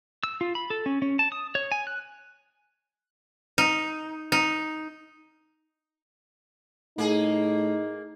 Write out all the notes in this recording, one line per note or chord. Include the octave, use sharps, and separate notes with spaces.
E6
F4
B5
A4
C#4
C#4
A5
D#6
C#5
G#5
F#6
D#4
D#4
A2 A#3 D#4 G#4